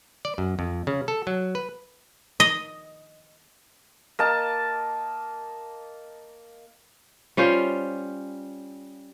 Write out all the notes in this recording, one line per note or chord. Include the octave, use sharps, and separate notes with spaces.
D5
F#2
F2
C#3
A4
F#3
B4
D#5
A#3 D#5 A5
G3 C#4 F4 C5